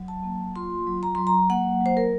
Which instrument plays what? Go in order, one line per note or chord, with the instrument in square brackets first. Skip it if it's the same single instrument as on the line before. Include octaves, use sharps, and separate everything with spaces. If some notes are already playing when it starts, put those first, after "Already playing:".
Already playing: [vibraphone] F#3
A5
A#3
F4 C6
F#3
A#5
F#3 C6
A#5
A#3 F#5
F#3 C5
A#4